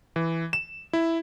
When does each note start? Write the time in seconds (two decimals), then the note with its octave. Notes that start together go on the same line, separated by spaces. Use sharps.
0.16 E3
0.53 E7
0.93 E4